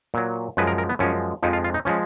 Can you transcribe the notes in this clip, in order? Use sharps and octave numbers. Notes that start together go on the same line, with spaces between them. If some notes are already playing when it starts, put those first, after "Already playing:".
A#2 F#3
F#2 F3 G#3 B4
A#4
A#4
B3
F#2 F3 G#3 C#4
F2 F3 G#3 D#4
F4
F4
D#4
F3 G#3 C#4